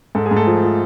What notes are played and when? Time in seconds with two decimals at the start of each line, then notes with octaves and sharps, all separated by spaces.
0.15 G#2 A4
0.26 G#4
0.31 G#2
0.36 A3 A4
0.47 F3
0.64 F3